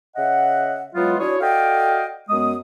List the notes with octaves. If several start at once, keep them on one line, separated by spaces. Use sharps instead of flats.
C#3 D#5 E5 F#5
E3 F#3 G#3 B3 F4
D4 E4 F#4 G#4 C#5
F#4 A4 D5 D#5 F5 G5
F#2 G#3 B3 D#6